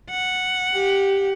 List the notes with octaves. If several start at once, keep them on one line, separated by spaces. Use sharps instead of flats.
F#5
G4